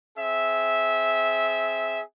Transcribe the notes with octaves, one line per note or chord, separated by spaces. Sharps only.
C4 G#4 E5